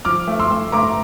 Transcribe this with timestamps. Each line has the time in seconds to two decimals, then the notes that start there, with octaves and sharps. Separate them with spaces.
0.05 F3 D6 F6
0.28 A3
0.39 C6 E6
0.51 A3
0.72 A3 A#5 D6